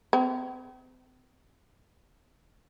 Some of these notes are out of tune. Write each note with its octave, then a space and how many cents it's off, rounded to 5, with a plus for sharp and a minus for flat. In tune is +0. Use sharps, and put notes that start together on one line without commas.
C4 -40